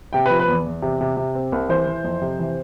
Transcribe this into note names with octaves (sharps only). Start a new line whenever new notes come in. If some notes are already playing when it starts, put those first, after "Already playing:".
C3 G5
F3 B4
B4
E2
E2
C3
C3
C3
C4
C2
E3 C5
E3
F2
C3
E3